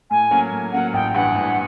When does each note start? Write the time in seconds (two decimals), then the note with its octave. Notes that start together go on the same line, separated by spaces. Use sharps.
0.10 A2 G#5
0.31 F#3 A#3 C#4
0.52 A2
0.72 F#3 A#3 C#4 F#5
0.93 A1 G5
1.14 G2 E3 F#5
1.34 A1